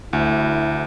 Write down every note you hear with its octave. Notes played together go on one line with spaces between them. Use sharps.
D2 E4